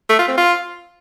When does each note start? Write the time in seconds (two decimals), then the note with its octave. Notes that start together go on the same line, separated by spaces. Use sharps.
0.09 A3
0.19 F4
0.28 C4
0.38 F4